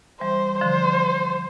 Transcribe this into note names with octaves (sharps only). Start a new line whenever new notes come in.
E3 G3 C5
D3 F3 C5